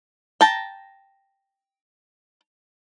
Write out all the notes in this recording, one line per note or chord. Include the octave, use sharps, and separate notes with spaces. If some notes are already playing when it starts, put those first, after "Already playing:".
G5 A5 A#5